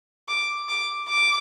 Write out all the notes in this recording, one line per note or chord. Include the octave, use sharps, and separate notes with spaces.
D6
D6
D6